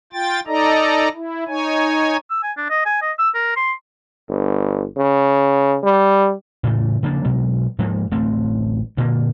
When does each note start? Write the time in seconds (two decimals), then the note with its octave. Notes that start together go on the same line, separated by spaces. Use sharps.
0.13 F4 G5 A6
0.47 D#4 A4 D5 D#5 A#5
1.14 E4
1.48 D#4 C#5 G#5
2.30 E6
2.43 G#5
2.57 D4
2.70 D#5
2.86 G#5
3.02 D#5
3.19 E6
3.35 A#4
3.56 C6
4.29 G1
4.98 C#3
5.83 G3
6.63 A2 C#3 E3 A3
7.03 C#3 F3 A#3 D4
7.25 B2 F#3 G#3
7.79 G#2 F3 G#3 A#3
8.11 D1 A1 A3 C4
8.97 G2 A#2 D3 A#3